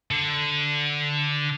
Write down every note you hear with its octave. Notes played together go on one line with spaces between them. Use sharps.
D3